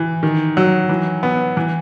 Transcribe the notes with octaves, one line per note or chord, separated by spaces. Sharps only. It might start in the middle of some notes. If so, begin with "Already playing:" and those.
Already playing: E3
D#3
F#3
E3
B3
E3